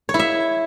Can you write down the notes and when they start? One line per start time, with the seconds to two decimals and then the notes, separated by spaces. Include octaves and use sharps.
0.09 C#5
0.14 E4
0.19 E5